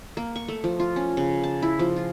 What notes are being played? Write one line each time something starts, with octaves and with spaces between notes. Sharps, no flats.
A#3
C#6
A3
F3
F4
C#4
C#3
A5
E4
F3
F4